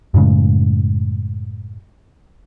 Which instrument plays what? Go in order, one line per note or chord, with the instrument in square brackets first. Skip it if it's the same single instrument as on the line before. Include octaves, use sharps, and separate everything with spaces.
[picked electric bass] F#2 A2 C#3 G#3